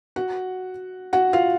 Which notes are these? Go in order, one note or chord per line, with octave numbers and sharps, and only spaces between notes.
F#4 F#5
F#4 F#5
F4 F5